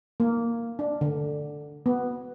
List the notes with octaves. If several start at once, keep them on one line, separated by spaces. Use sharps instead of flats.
A#3
D4
D3
B3